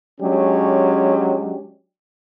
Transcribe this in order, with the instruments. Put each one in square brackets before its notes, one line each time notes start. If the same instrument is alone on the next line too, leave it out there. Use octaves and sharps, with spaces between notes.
[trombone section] F#3 G#3 C#4 D4 G4